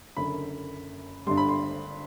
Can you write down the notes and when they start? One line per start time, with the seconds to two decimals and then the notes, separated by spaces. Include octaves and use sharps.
0.17 F#1 F#2 D3 B5
1.26 G1 G2 D3 G3 C6
1.37 B5
1.48 C6